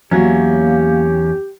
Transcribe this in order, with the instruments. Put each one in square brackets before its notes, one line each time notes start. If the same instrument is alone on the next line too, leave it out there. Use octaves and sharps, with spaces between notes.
[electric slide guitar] E2 C#4 [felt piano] F#3 [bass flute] A#3 [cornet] G4